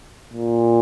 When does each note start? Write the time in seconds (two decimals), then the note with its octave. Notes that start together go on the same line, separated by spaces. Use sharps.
0.33 A#2